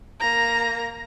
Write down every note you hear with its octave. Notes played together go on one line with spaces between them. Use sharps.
A#3 A#5